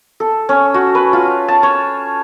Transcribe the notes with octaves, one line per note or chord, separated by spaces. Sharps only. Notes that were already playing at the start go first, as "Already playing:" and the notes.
A4
C#4
F#4
B4
F4
A5
C#5